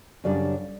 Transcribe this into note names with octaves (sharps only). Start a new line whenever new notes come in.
F#2 C#3 G3 D4 D5